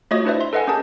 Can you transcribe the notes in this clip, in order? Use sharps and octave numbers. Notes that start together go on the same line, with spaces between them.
A3 F4 F#4 C#5 D#5 D#6
D4 E4 B4 C5 D5 E5
E5 C6
A4 B4 D#5 F5 F#5 G#5
C#4 G4 G#4 A#4 A5